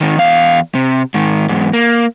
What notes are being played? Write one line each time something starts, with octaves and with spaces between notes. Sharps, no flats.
G#2 D#3
E2 F5
C3
G#2 D#3
E2 G#2
A#3